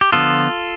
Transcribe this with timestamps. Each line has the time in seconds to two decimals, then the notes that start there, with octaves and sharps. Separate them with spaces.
0.01 G4
0.12 D3 F3 B3 F4 A4